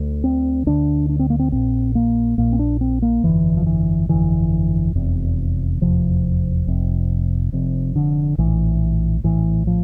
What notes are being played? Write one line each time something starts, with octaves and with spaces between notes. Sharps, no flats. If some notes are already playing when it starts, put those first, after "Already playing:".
Already playing: D2 D3
C4
D2 D3 D4
D4
C4
A#3
C4
A#1 A#2 C4
A#3
A#1 A#2 A#3
C4
D4
C4
A#3
G1 F2 D3 E3
F3
E3
G1 F2 D3 E3
F1 E2 C3
F1 E2 C3 F3
F1 F2 C3
F1 F2 C3
D3
A#1 A2 E3
A#1 A2 E3
F3